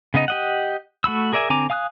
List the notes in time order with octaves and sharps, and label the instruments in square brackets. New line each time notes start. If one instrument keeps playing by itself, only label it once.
[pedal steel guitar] C#3 B3 D#4 D#5
G4 D#5 F#5
A3 F#4 B5 E6
G#4 A#4 D5 E5 G#5
D3 C4 G#5 A#5 D6
F5 G#5 D#6 E6 F#6